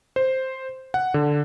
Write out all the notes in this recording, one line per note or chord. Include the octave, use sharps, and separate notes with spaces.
C5
F#5
D3